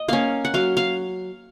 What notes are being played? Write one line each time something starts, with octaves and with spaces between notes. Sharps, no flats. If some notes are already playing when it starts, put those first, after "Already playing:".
Already playing: D#5
A#3 C#4 F5
F#5
F#3 F5
F5